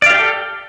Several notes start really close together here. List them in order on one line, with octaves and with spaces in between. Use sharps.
D5 F5 G4 G5 A4